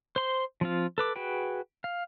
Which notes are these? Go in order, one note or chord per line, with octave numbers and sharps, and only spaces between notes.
C5 C6
F3 C4 F4
A4 B4 D6
F#4 G#4 B4 G5
F5